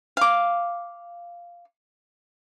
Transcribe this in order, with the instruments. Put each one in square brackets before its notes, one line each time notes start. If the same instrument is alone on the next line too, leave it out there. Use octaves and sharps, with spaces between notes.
[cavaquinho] F5 D6